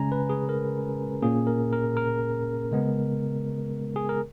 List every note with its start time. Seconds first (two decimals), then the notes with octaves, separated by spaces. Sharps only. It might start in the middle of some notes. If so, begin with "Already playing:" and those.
Already playing: C#3 G#3 C#4 G#5 A#5
0.12 B4
0.29 G#4
0.49 A#4
1.22 A#2 A#3 C#4 G#4
1.47 A#4
1.73 A#4
1.97 A#4
2.72 C#3 G#3 B3
3.96 G#4
4.09 A#4